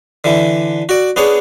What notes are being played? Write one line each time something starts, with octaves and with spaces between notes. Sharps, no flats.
D3 E3
F#4 D5
B3 D4 G#4 C#5